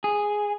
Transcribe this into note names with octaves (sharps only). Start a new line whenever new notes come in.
G#4